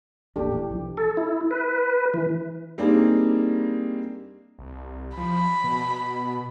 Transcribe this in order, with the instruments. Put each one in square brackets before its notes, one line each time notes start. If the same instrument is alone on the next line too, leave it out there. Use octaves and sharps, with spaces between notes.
[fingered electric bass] E1 A1 A#2 [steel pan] D4 G4 A4
[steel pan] E3 G4
[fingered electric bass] B1 C#3 F3
[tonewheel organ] A4
E4
B4
E3
[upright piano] G3 A#3 C4 D4 D#4 G#4
[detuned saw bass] C2
[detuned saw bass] F3 [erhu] B5
[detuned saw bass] B2